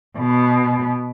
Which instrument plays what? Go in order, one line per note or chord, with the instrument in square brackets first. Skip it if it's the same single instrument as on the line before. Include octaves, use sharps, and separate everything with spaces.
[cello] B2